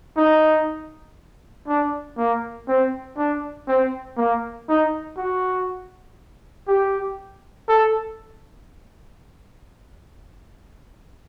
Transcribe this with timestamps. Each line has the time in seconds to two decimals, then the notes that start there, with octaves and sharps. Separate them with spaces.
0.17 D#4
1.68 D4
2.18 A#3
2.68 C4
3.17 D4
3.68 C4
4.17 A#3
4.69 D#4
5.18 F#4
6.68 G4
7.69 A4